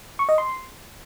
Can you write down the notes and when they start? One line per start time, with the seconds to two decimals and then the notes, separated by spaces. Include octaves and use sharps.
0.19 C#6
0.29 D#5
0.38 C6